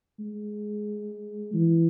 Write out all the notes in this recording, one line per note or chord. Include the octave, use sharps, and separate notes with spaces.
G#3
E3